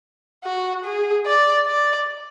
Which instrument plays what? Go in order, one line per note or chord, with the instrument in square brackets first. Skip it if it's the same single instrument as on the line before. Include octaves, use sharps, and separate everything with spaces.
[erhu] F#4
G#4
D5
D5